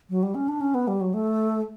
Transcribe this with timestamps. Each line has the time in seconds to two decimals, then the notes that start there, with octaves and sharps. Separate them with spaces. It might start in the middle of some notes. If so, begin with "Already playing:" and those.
0.10 F#3
0.23 G3
0.35 C#4
0.48 D4
0.61 C#4
0.74 B3
0.88 G3
1.01 F#3
1.14 A3